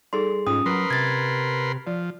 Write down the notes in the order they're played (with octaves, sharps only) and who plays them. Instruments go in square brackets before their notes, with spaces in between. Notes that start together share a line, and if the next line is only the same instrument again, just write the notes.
[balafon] G3 D#4 A4 [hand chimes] G#4 C6
[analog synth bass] G#2 [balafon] C#4 F4 [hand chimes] D#6
[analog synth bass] F#3 [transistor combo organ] A#4 B4 C6
[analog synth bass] C3 [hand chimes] G#6 A6
[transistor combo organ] F3 [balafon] D5